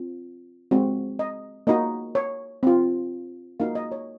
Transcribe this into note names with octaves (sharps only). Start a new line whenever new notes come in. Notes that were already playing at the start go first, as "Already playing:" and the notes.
Already playing: C4 F4
G#3 C4 F#4
D#5
A#3 D#4 F#4 D#5
C#5
C4 F4
A#3 D#4 F#4 F5
D#5
C#5